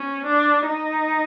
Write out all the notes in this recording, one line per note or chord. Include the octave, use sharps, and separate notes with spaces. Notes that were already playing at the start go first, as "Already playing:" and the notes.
Already playing: C#4
D4
D#4